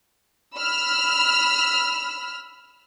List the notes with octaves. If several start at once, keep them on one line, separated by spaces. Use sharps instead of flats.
B5 E6 F6